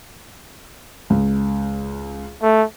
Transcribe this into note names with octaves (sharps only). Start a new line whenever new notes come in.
C#2
A3